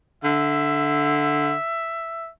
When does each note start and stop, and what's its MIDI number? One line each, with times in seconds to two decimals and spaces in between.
0.24 1.54 50
0.24 2.30 76